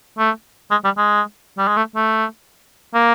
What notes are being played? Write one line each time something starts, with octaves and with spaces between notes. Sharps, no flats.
A3
G#3
G3
G#3
G3
G#3
A3
A3
A#3